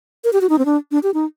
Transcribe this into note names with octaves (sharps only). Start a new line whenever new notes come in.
A#4
G4
F#4
D#4
C4
D4
D4
G4
D#4